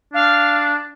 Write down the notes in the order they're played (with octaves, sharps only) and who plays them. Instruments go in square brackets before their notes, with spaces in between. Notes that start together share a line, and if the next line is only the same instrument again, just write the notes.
[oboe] D4 [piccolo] F5